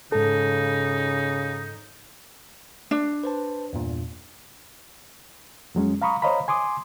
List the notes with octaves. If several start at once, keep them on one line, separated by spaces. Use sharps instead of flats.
G#2 C#3 D#4 A4
D4
B4 C5 A5
E2 G2 A#2
F2 F#3 G#3 C#4
F5 A#5 B5 C#6 D#6
C5 C#5 D#5 F5 A#5 B5
G#5 C6 D6 D#6